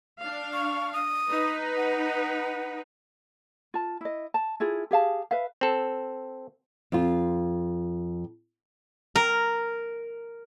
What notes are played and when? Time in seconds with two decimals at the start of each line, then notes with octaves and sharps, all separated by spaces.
0.19 D4 F5
0.54 C#6
0.93 D#6
1.29 D#4 B4
1.77 F#5
3.74 F4 A5
4.01 E4 D#5
4.34 A5
4.60 E4 F4 G#4
4.91 G4 G#4 F5 A5
5.31 B4 E5 F5
5.61 C4 A4
6.92 F2 F4
9.16 A#4